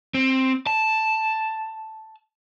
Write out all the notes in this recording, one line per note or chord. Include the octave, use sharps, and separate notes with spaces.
C4
A5